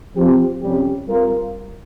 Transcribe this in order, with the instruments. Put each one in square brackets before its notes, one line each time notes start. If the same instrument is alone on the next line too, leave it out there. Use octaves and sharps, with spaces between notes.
[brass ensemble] F3 C4 G4
F2 C3 G3 C#4 G4
G3 C4 F4 A#4